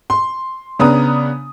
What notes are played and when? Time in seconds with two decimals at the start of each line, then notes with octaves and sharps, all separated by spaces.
0.10 C6
0.79 C#3 B3 D4 A#5 D#6